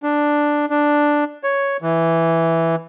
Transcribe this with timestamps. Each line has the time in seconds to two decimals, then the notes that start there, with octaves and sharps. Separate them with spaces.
0.03 D4
0.70 D4
1.44 C#5
1.82 E3